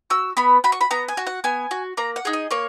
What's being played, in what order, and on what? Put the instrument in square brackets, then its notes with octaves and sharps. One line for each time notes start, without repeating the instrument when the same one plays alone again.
[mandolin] F#4 E6
B3 B5
F#4 B5
C#6
B5
B3 A#5
G#5
F#4
F#5
B3 G#5
F#4
A#3 A#5
F#5
D#4 G#4
D#5
A#3 C#5